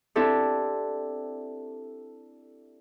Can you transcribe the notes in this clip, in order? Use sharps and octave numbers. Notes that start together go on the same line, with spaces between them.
C4 D4 E4 G4 A4